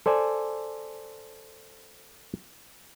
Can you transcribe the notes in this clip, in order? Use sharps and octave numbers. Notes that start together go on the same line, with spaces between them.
A4 C5 D5 G#5